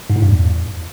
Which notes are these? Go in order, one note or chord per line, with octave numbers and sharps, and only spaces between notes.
G#2
A2
G2
E2